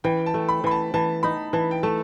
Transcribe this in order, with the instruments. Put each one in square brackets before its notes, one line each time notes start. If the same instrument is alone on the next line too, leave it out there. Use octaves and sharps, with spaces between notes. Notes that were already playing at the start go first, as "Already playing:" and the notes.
[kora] E3 [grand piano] G5
[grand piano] A5
[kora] A3
[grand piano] B5
[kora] E3 [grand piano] B5
[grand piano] A5
[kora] E3 [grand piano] A5
[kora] D#4 [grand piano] B5
[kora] E3 [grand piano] A5
[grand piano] G5
[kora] A3 [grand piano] A5